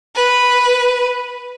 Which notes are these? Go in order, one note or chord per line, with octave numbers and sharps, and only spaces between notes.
B4